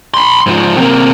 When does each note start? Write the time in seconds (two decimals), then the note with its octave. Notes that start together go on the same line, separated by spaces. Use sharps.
0.14 B5 C6
0.46 G#2 F3
0.77 C3 A#3